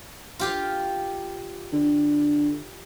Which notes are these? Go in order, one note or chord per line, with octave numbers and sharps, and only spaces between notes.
F4 G4 F5
D3